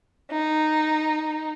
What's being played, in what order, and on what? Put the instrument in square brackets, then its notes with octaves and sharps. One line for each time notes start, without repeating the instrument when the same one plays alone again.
[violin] D#4